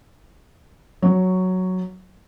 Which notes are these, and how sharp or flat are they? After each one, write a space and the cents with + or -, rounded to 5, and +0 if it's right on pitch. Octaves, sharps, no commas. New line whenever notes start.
F#3 +0 C#5 +0